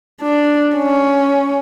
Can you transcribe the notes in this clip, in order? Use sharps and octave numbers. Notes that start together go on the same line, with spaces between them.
D4
C#4